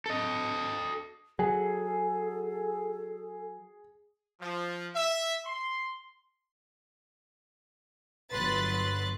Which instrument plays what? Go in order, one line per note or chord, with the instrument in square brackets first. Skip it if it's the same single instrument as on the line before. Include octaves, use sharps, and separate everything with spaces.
[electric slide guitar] A4 D#5
[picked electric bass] F#3 [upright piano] G#4 [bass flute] A4
[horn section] F3
E5
C6
[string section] G1 F#3 B4 C6 F#6 A6